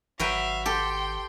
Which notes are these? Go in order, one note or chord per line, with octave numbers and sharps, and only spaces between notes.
G#1 F#3 B4 E5 F5 G5
G4 A4 G5 C6